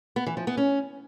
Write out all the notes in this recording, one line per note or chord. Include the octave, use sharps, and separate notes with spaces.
B3
E3
F3
B3
C#4